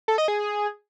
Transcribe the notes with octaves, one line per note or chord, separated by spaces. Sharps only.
A4
D#5
G#4